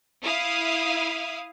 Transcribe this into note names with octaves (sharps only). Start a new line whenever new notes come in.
E4 F5 D#6